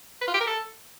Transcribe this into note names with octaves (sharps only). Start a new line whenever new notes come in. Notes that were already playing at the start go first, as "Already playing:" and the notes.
B4
F4
G4
A#4
A4